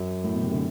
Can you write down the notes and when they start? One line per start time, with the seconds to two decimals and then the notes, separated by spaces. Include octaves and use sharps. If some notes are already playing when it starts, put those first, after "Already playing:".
Already playing: F#2 F#3
0.24 A2
0.34 B2
0.43 C3
0.52 D3